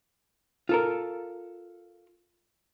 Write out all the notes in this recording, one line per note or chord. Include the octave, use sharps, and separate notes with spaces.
F4 A4 A#4